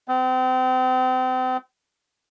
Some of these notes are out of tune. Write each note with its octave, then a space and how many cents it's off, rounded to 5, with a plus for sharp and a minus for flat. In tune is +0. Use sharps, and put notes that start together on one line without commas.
C4 -35